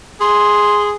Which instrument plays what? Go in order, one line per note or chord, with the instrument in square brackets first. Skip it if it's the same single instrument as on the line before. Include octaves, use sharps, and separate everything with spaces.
[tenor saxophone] G#4 [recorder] C6